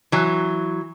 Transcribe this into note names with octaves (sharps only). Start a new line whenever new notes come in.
E3 F#3